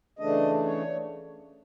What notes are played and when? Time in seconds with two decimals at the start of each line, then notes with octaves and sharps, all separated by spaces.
0.19 C#3 E3 A3 D4 D#5
0.65 C#5